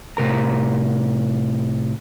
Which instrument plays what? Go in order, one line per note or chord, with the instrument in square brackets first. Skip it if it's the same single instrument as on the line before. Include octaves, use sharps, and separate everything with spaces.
[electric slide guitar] A2 C3 A#4 A#5